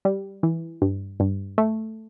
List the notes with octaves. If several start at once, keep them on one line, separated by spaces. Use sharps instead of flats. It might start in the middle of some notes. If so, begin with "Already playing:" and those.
G3
E3
G2
G2
A3